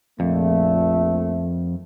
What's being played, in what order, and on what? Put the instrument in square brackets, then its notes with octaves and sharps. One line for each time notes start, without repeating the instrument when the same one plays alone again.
[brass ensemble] A#1 A3 [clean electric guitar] F2